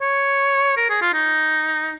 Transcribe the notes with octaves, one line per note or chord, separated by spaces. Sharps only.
C#5
A#4
G#4
F4
D#4